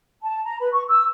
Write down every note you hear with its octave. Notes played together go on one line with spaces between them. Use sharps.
A5
A#5
B4 B5
C#6
E6